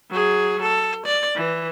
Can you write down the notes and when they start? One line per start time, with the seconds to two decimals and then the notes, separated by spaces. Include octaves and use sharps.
0.10 F#3 G#4
0.62 A4
1.06 D5
1.36 E3